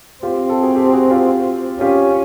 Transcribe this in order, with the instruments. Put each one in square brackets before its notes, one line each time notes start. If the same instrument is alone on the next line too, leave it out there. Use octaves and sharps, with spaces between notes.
[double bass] C4 [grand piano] F4 G4
[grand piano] G4 A4
F#4 G#4
G4 A4
F#4 G#4
F4 G4
[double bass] C#4 [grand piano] F4 G4